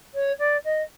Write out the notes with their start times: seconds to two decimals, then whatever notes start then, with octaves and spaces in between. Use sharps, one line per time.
0.14 C#5
0.39 D5
0.64 D#5